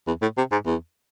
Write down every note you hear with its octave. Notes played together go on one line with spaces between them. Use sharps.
E2
A2
C3
G#2
E2